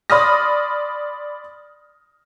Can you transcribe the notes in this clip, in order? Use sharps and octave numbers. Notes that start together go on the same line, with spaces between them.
D5 B5 C6 D#6 F6 A#6